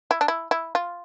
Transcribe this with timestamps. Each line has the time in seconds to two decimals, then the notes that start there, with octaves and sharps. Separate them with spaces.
0.11 E4
0.21 D4
0.28 E4
0.51 E4
0.75 F4